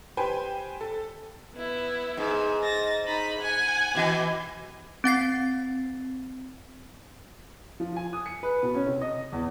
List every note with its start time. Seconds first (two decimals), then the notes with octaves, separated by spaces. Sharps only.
0.17 G4 B4 C5 G5 G#5
0.81 A4
1.55 B3 E4
2.17 G#2
2.63 A6 A#6
3.06 D#4 B5
3.40 F#5 G#5
3.95 B2 E3
5.04 C4 F#5 A6 C7
7.80 F3
7.96 G#5
8.13 D#6
8.26 C#7
8.43 B4
8.63 B2
8.75 C#4
8.87 C3
9.01 D#5
9.33 E2